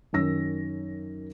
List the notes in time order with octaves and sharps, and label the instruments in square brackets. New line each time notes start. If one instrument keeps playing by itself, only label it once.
[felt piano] F#2 D#3 C#4 E6 A#6